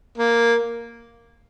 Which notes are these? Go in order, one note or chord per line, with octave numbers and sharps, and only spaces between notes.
A#3